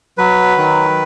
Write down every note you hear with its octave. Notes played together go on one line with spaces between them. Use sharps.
F#3 B4
D#3